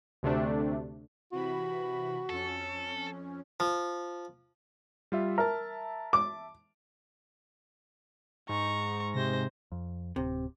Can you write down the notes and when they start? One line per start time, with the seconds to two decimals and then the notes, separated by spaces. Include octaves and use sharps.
0.23 D2 C3 A3 D4
1.32 C3 E3 F#4 B5
2.29 F2 C#4 A4
3.60 F3
5.12 G3 F4 E5
5.38 A#4 E5 A5
6.13 D6
8.49 G#2 A#5 C#6
9.15 C3 C5 A#6
9.72 F2
10.16 D1 C3